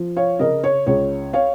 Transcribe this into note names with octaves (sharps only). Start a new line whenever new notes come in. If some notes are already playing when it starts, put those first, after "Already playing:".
Already playing: F3
C#5 F5
C#3 A#4 D#5
C#5
C#2 C#5
C#5 F5